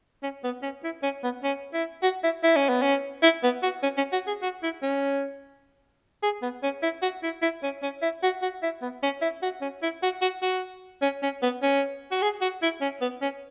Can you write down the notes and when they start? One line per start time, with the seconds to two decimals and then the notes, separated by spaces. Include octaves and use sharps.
0.23 C#4
0.44 B3
0.63 C#4
0.84 E4
1.03 C#4
1.24 B3
1.44 C#4
1.74 E4
2.03 F#4
2.24 E4
2.43 E4
2.56 C#4
2.69 B3
2.82 C#4
3.23 E4
3.43 B3
3.63 F#4
3.83 C#4
3.97 C#4
4.13 F#4
4.28 G#4
4.43 F#4
4.63 E4
4.83 C#4
6.23 G#4
6.43 B3
6.63 C#4
6.83 E4
7.02 F#4
7.23 E4
7.42 E4
7.63 C#4
7.83 C#4
8.02 E4
8.23 F#4
8.42 F#4
8.63 E4
8.82 B3
9.03 C#4
9.22 E4
9.43 F#4
9.62 C#4
9.83 E4
10.03 F#4
10.22 F#4
10.42 F#4
11.02 C#4
11.23 C#4
11.43 B3
11.63 C#4
12.11 F#4
12.22 G#4
12.41 F#4
12.62 E4
12.82 C#4
13.01 B3
13.22 C#4